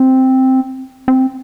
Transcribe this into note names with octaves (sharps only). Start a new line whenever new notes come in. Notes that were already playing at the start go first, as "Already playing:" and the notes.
Already playing: C4
C4